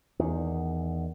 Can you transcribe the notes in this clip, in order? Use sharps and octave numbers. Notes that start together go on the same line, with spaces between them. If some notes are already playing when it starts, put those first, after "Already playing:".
E2 D#3